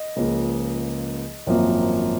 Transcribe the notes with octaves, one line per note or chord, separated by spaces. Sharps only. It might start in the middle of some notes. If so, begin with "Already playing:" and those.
Already playing: D#5
C#2 C#3 F3 A#3
G#1 F#2 F3 A#3